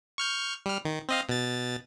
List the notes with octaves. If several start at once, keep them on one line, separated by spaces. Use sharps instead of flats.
C#6 F6 G6
G3 F6
D#3
C4 D#5 F5
B2 A6